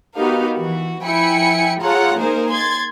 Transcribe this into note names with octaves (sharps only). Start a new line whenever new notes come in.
B3 D#4 F#4 G4 A#4 F5
E3 F#4
F3 E4 G5 G#5 B5 C#7
F4 G#4 A4 C#5 F#5 A#5
A#3 D#4 G#4 A#4 C5
C6 G#6 A6